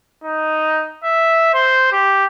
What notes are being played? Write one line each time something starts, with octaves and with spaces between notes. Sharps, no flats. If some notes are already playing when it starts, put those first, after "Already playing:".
D#4
E5
C5
G4